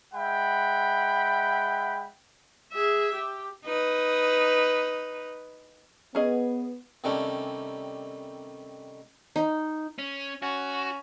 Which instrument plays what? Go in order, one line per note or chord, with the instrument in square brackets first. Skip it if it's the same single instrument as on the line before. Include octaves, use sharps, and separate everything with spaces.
[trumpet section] G#3 E5 F#5 G5 B5
[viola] G#4 E5
G4
[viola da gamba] D#4 B4
[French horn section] B3 [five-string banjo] C#4 G#4 D#5
[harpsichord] C3 D#3 G3 A3 C#4 D4
[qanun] D#4
[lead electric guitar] C#4
[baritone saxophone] C#4 [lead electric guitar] F#4